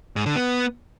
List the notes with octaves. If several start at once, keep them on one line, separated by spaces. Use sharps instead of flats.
G#2
D3
B3